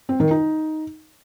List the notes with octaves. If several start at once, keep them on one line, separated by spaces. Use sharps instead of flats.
C4
D#3
D#4